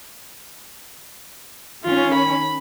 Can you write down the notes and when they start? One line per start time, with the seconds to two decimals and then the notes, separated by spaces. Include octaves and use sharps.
1.85 D#3 C#4 F4
2.14 B5